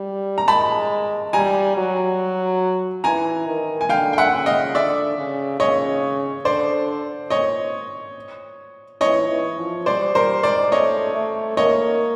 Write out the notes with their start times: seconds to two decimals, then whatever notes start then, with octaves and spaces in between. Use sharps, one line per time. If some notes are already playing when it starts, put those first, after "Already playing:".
Already playing: G3
0.38 A#5
0.48 G#3 A5 B5
1.33 G3 G#5 A#5
1.77 F#3
3.04 E3 G#5 A#5
3.47 D#3
3.81 G#5
3.89 D3 F5 G5
4.13 G5
4.18 E5 F#5
4.32 C#3
4.46 D#5 F5
4.74 D3 D5 E5
5.18 C#3
5.60 C#3 C#5 D#5
6.45 D3 C5 D5
7.30 C#5 D#5
9.01 E3 C#5 D#5
9.30 E3
9.58 F3
9.86 G3 C5 D5
10.15 G3 A#4 C5
10.43 G#3 C5 D5
10.72 A3 C#5 D#5
11.15 A3
11.57 A#3 C#5 D#5